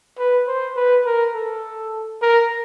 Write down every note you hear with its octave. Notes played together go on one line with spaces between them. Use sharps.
B4
C5
B4
A#4
A4
A#4